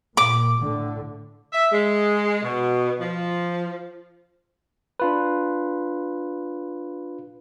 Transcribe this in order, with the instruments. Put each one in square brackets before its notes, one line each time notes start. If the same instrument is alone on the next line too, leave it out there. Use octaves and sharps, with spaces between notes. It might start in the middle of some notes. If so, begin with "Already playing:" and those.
[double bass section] A#2 [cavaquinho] D6
[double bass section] A2 D3
[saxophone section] E5
G#3
B2
F3
[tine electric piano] D4 F4 B4